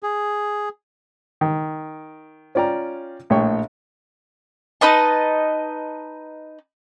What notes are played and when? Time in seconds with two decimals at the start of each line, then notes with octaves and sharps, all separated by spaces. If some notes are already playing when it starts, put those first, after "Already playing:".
0.03 G#4
1.41 D#3
2.55 C#4 F4 D5 G5 A#5
3.30 A#1 A2 C#5 G5 C#6
4.81 D#4 B4 D#5 A5